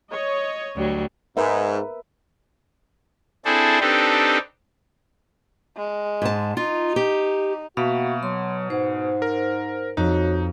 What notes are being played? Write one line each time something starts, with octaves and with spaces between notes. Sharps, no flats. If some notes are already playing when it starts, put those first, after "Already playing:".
C#5 D#5
D2 F#3 G3
G#2 A#4 B4 E5
C4 D4 E4 G#4 A4 C5
C4 D4 D#4 G4 A4 B4
G#3
G#2 A5
D#4 F4
G4
B2 A#3 F#4 E5 F5 B5
F#3 C6
G#2 C5
A#4
F2 D#4 F#4 C#5